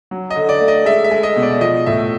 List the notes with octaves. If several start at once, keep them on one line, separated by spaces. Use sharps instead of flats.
F#3
D#5
D3
D5
A3
D#5
G#3 E5
E5
G#3
D#5
B2
D5
F3 D#5
A2 E5